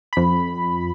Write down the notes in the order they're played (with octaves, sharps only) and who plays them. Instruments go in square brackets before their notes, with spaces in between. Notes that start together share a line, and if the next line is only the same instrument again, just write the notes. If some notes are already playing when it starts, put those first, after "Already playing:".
[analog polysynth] F2 B5